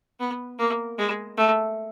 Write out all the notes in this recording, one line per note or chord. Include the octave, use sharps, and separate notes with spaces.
B3
A#3
G#3
A3